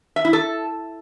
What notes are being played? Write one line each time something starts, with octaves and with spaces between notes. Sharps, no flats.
E5
E4
A4